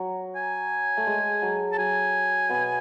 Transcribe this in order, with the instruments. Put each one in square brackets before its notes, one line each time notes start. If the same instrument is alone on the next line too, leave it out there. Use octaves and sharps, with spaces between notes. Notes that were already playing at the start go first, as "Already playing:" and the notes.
Already playing: [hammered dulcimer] F#3
[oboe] G#5
[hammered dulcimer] A3
G#3
F#3
[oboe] A5
[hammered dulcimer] F#3 [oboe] G#5
[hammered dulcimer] B2 B3